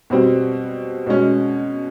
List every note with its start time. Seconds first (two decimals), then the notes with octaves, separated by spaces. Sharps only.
0.10 B2 G3 C4
1.06 B2 G#3 C#4